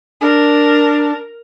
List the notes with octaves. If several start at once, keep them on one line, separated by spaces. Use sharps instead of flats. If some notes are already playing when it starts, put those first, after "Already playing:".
D4 A#4